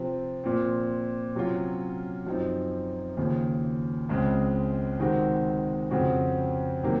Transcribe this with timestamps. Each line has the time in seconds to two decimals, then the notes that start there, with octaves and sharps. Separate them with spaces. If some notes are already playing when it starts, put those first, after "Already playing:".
Already playing: C3 F3 C4
0.44 A#2 F3 C4
1.35 C3 F#3 C#4 F4
2.27 F#2 F3 C4 D#4
3.17 D#2 C#3 F3
4.09 C#2 C#3 G#3 C4
5.00 C3 D#3 G#3 C4 F#4
5.91 F2 C#3 F3 C4 F#4
6.83 C3 D#3 F#3 A#3